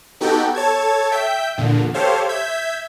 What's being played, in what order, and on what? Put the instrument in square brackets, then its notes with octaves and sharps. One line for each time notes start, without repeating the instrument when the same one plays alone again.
[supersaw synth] B3 D#4 F#4 G4 A4 G5
A4 C#5 A5 G#6
E5 G5 G6 B6
E2 A#2 D3
G4 A4 C5 C#5 F5
E5 G6 G#6 B6